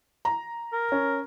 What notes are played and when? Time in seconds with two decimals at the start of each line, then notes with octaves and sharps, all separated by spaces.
0.25 A#5
0.73 A#4
0.92 C#4